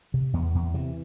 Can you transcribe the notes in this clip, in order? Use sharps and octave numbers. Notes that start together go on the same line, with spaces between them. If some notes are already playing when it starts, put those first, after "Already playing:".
C3
E2 B3
E2
C3 E3